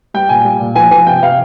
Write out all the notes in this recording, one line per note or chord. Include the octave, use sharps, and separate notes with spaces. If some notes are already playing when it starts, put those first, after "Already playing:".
G3 G5
A#2 G#5
G3
A#2
F3 G#5
F3 G#5
C3 G5
C3 F5